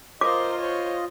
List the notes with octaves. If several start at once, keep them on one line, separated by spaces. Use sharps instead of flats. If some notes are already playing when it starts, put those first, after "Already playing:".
F4 A#4 C5 D#5 D6
C5 C#5